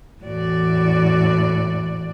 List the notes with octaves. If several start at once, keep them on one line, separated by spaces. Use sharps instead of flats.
E2 A2 F#4 D5